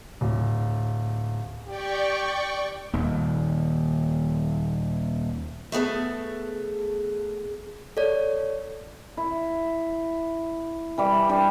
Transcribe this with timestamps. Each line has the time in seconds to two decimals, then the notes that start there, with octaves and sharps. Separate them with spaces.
0.21 D1
1.67 G4 D5 G5 C#6
2.93 D#1 D#2
5.72 A3 B3 G#4 A4
7.97 A4 C#5 D5
9.17 E4
10.98 E3 G3 G4
11.29 G3 D4